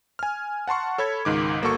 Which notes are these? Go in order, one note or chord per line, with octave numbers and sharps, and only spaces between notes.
G#5 F6
F#5 A5 C6 C#6
A4 C#5 B5 G#6
C#2 G#2 D#3 D6
G1 A#3 F#4 A4 C#6